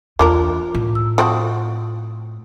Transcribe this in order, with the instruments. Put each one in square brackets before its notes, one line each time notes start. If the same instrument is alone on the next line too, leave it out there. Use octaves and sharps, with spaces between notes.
[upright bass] E2 [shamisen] A#3 D4 A#4 [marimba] F4
[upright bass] A2
[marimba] E6
[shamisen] F3 C4 F#4 [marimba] C6 C#6 D#6